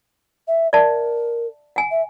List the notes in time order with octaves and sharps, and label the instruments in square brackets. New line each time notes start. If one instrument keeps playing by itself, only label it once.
[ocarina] E5
[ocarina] A#4 [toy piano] D5 E5 A5
[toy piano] F#5 G#5
[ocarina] E5